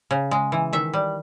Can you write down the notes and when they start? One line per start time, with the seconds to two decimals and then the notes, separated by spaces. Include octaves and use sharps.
0.11 C#3
0.31 G#3
0.52 E3
0.73 D#3 E5
0.94 G3